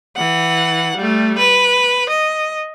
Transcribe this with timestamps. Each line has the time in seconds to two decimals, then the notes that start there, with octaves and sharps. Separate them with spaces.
0.16 E3 F#5
0.97 G3 A3
1.38 B4
2.09 D#5